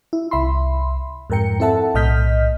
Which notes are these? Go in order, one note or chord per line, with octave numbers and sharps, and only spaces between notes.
E4
C2 E5 B5 C6
F2 G#2 A#4 G5 C#7
C4 E4 A4 E5 F#5 A5
B1 A2 D#5 F6 G6 B6